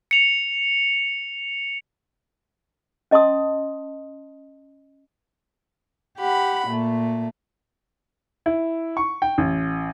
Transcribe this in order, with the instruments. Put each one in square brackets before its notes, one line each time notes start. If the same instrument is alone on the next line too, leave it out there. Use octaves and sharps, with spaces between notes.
[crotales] C#7 F7
[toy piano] C#4 D#5 A5 C6 D#6
[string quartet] G4 F#5 B5
A#2 A3
[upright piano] E4
C#6
G5
A1